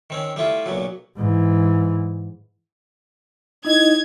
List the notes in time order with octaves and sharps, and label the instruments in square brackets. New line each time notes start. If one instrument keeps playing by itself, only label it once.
[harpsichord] D#3 C4 C#4
G3 A3 E4 F4
B1 A#2 F#3
[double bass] G#2 E3
[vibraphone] D#4 E4 D#5 [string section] G#6